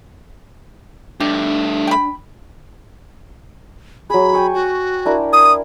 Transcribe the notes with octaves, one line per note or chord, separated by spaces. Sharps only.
G2 A3 D4 G4
G5 B5
F#3 G#4 B5
G5 G#5 C#6
F#4
D4 E4 A#4
D#6